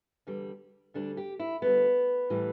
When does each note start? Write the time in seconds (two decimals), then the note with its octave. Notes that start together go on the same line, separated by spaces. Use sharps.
0.27 E2 D3 G3
0.94 D2 D3 G3 D4
1.17 G4
1.39 E4
1.62 D2 D3 G3 B3
2.30 A2 E3 G3